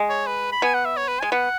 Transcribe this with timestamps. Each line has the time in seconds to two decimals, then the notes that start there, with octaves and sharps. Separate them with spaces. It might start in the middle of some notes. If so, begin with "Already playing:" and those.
Already playing: G#3
0.09 C#5
0.27 B4
0.52 B5
0.62 B3 G#5
0.74 F#5
0.85 E5
0.97 C#5
1.08 B4
1.20 G#3 G#5
1.32 B3 F#5